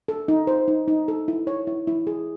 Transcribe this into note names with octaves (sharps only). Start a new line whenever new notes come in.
A4
D#4
C5
D#4
D#4
A4
E4
C#5
E4
E4
G#4